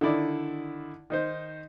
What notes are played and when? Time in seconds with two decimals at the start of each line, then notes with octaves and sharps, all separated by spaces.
0.01 D3 D#3 E4 D5
1.10 D#3 D#4 C5